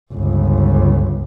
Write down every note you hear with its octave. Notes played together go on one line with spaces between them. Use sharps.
G1 C#2